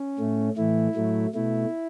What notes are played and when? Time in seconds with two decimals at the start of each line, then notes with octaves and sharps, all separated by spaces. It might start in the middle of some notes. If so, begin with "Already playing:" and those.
Already playing: C#4
0.19 A2 A3
0.57 A2 E3 A3 E4
0.96 A2 F#3 A3
1.35 B2 A3 E4